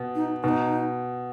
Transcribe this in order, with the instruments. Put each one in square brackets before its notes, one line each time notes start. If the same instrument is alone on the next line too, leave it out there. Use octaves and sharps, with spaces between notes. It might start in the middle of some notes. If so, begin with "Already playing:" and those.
Already playing: [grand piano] B2
[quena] D#4
[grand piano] B2 [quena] D#4